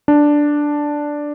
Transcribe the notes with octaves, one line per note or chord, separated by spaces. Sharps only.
D4